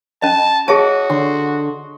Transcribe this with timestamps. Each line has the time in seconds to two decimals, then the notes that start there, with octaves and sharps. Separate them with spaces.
0.22 C#4 D#5 A5
0.68 F#4 G#4 C#5 D#5 E5 A5
1.10 D3 C6